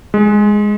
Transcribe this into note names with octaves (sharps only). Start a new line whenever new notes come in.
G#3